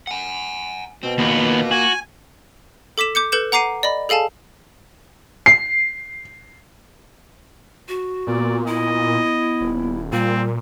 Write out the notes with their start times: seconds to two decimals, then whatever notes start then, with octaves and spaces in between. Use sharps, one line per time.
0.07 F#5 G#5
1.03 B2 C4
1.18 D#2 A#3 B3 F4
1.71 F#4 G#5
2.98 A4 D6 B6 E7
3.15 D6 G6 C#7
3.32 A4 B4 G6 C#7 E7
3.52 F#5 A#5 D6 C7 D#7
3.83 D5 D#5 B5
4.09 G#4 A4 F5 G#5 A5
5.46 C7
7.88 F#4
8.27 A#2 B3 D5
8.67 E4 D#5
9.61 D#1
10.13 A#2 G3 C4 F4